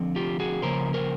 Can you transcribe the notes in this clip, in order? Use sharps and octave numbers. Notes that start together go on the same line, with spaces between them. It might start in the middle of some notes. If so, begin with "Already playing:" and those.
Already playing: D3 F3 C4
F4 G4
F#4 G#4
C#3 F3 A#3 C#4 A#4 C5
A#4 C5